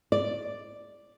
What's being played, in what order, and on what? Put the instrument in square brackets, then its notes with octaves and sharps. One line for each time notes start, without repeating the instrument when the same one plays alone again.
[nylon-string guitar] D5